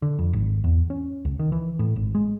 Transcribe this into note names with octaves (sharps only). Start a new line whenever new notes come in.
D3
F2
G#1
E2
C#4
C#2
D#3
E3
A2
G#1
G#3